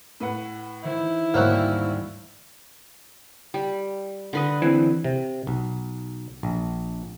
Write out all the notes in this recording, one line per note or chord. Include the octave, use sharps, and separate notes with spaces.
A2 B4 F#5
D#3 E3 E4 C5
D2 G#2 G3 A#3 C4 C#5 F#5
G3
D3 B4 D#5
E3 C4
C3
B1
A#1